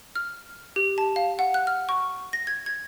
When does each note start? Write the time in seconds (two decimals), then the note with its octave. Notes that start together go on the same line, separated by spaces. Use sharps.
0.16 F6
0.76 G4
0.98 A5
1.16 F5
1.39 F#5
1.54 F#6
1.67 F6
1.89 C#6
2.33 A#6
2.47 G#6
2.66 G#6